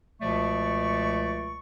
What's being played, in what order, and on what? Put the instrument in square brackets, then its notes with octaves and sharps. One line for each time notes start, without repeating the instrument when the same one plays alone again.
[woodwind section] C#2 B2 F3 A3 D5 C#6